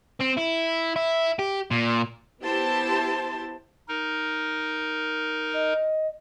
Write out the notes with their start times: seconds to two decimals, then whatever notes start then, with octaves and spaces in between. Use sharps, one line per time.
0.20 C4
0.37 E4
0.96 E4
1.39 G4
1.71 A#2
2.41 B3 E4 G4 C5 A5
3.88 D#4 A#4
5.53 D#5